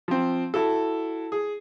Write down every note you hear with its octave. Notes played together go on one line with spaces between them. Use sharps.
F3 C4
E4 F#4 A4
G#4